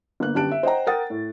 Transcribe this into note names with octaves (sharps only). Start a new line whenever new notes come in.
G1 A#3 F#6
G1 F#2 G4 A5 F#6 D7
E5
C5 D#5 F#5 G5 A#5
A#4 F#5 G5 D#6 A6
A2